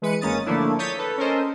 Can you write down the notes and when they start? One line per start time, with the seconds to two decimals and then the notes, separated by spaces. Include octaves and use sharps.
0.02 E3 G#3 B4 C#7 D#7
0.21 G#1 G#3 A#3 C#4 D#6 A6
0.46 D3 F3 A3 A#3 D4 E4
0.79 C#5 D#6 G6 A6 B6
0.99 A4 B4
1.18 C#4 A4 A#4 C5 D#5